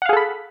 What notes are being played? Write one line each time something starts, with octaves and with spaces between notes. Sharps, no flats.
G#4 A4 F5 F#5 B5